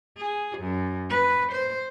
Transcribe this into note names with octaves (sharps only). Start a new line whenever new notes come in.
G#4
F#2
B4
C5